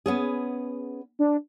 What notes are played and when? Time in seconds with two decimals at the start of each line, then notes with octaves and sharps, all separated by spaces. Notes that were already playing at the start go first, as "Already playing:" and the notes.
0.06 B3 C#4 G#4
1.19 D4